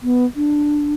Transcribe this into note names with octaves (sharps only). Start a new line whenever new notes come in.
B3
D4